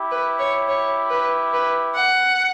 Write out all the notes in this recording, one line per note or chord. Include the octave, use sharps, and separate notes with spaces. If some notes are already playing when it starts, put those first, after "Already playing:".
Already playing: E4 G4
B4
C#5
C#5
B4
B4
F#5